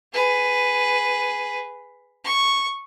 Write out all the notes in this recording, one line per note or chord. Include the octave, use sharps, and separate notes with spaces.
G#4 B4
C#6